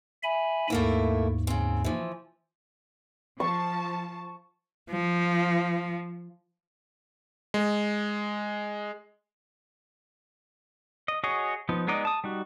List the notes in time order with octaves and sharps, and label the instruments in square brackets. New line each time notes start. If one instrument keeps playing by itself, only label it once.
[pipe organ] E5 G#5 B5
[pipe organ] D#2 G#2 [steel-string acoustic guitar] A3 A#3 E4
[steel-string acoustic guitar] C#3 C4
E3 F3
[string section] F3 A5 [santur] C#6
[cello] F3
[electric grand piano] G#3
[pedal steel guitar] D#5
F#4 G#4 C#5 D#5
F3 B3 D#4
G#3 B3 D#4 D5 D#5
A5 D#6
G3 D#4 F#4